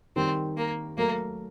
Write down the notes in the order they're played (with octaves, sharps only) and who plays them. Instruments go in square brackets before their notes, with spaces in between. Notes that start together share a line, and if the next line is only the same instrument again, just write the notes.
[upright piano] D#3 G3 [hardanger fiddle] C4
[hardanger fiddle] A#3
[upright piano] F#3 A3 [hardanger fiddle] A#3